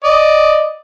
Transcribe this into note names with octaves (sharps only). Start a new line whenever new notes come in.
D5 D#5